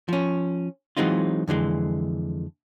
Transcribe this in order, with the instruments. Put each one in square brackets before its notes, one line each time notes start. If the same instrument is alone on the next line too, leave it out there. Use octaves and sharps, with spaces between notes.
[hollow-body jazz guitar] F3 C#4
E3 F#3 G#3 C4 D#4 F4
F2 D3 E3 G#3